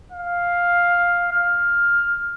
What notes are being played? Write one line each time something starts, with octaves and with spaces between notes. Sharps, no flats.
F5
F6